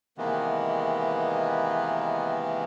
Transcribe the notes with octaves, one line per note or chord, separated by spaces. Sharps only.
C3 D#3 E3 G#3 A#3 B3